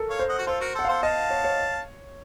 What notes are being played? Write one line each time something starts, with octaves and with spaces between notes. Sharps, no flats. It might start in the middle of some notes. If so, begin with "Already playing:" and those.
Already playing: A4 A#4
C#5 F5
C5
D#5 F#5
F#4
F4 A4 C5
F#4 A#4
A4 C5 F#5
A4 C5 F5
D#5 F5 A5
C#5
C#5